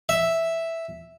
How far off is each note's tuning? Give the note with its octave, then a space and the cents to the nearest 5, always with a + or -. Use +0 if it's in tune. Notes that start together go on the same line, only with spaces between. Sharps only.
E5 +0